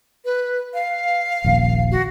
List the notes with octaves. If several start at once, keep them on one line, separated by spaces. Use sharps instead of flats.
B4
F5
D#1 A#1 D#2
F#4